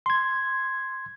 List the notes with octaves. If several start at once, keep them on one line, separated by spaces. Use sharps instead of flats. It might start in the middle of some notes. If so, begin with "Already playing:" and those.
C6 G#6